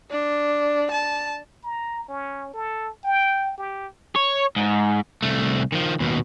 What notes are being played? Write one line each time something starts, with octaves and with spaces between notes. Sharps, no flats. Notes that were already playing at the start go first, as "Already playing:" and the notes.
D4
A5
A#5
C#4
A4
G5
G4
C#5
G#2
C2 A3
D#3 F3
D#2 B2